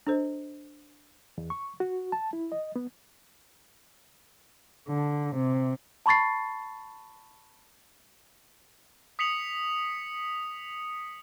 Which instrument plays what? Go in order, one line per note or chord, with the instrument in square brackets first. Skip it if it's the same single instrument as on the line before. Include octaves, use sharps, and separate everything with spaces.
[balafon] D4 A4 C5 D#5
[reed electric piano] E2
C#6
F#4
A5
E4
D#5
B3
[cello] D3
C3
[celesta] A5 B5 C#6 A6 C7
[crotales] D#6 B6 C#7 F7 F#7